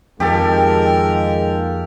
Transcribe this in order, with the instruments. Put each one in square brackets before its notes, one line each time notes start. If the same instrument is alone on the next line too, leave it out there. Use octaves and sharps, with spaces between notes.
[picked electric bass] F2 [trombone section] D#3 G#3 A#3 [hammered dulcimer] G4 A4 A5 [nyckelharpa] A#4